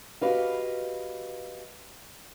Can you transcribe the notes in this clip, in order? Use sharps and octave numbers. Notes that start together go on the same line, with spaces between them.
F#4 G4 B4 D#5 F5